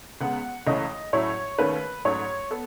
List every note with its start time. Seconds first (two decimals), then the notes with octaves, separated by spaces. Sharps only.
0.21 C#2 C#3 G#3 B3 F#5
0.67 C#2 C#3 E3 A3 C#4 D#5
1.13 A2 F#3 C#4 E4 C#5
1.59 D#2 D#3 A3 C#4 B4
2.05 G#2 F#3 A3 C#4 C#5
2.51 B3 A4